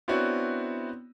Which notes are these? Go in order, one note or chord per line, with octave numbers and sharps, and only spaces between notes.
B3 C4 D4 E4 F#4 C#5